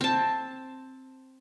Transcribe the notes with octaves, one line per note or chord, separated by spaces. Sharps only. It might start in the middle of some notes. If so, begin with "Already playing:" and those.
C4 A5